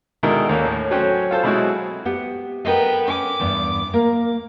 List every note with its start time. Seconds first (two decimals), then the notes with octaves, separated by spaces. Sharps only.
0.23 B2 D3 D#3 G#3 E4 A#4
0.49 D#2 D3 A#3 C#4
0.66 A2
0.91 F#3 A3 C#4 F#4 C5 G5
1.31 F4 A4 C5
1.43 B2 F#3 G#3 C4 E4 F#4
2.05 B3 G4 F#5
2.65 B3 A4 A#4 D#5 G5
3.08 C#4 G#5 D6
3.40 E2 G2 B3
3.94 A#3 A#4